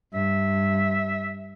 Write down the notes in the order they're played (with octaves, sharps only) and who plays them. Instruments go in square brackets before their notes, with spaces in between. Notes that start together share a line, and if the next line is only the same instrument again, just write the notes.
[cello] G2 [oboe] E5